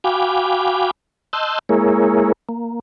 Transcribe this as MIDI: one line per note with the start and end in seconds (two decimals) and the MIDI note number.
0.04 0.91 66
0.04 0.91 77
0.04 0.91 79
0.04 0.91 80
0.04 0.91 83
0.04 0.91 86
1.33 1.59 75
1.33 1.59 81
1.33 1.59 84
1.33 1.59 88
1.33 1.59 90
1.33 1.59 91
1.69 2.32 56
1.69 2.32 58
1.69 2.32 64
1.69 2.32 68
1.69 2.32 70
1.69 2.32 73
2.49 2.80 58